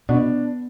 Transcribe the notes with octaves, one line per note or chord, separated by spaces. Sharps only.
B2 D4